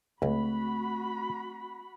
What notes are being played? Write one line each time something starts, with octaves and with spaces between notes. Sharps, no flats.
C#2 A3 C4 F#4 B5